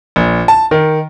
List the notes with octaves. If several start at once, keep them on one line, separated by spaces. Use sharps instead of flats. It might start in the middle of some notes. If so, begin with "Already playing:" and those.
A#1
A5
D#3